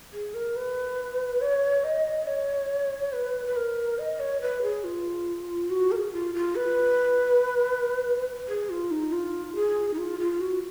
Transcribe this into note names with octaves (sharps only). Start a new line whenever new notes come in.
G#4
A#4
B4
C#5
D#5
C#5
B4
B4
A#4
D#5
C#5
B4
G#4
F4
F#4
A#4
G#4
F4
F4
B4
G#4
F4
D#4
F4
G#4
D#4
F4
F4
F#4